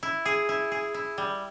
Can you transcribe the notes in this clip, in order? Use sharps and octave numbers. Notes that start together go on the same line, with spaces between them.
E4
G#4
E4
G#4
E4
G3